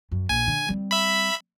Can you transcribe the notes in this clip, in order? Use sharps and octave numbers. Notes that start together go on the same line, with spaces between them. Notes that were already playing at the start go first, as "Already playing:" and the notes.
F#2
A#1 G#5
D3
G3 C4
E5 B5